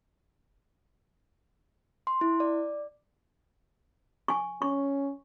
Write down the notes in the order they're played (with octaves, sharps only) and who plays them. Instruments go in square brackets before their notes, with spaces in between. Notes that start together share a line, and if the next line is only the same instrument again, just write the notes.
[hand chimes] C6
E4
D5
[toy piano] G#5 C#6
[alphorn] C#4 [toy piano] C#6